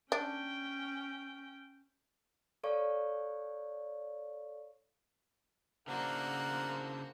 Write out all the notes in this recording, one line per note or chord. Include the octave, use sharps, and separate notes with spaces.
C#4 D4 G5
A4 C#5 D5 F5 C#6
C#3 A#3 D4 E4 F#4 A#4 C5 F#5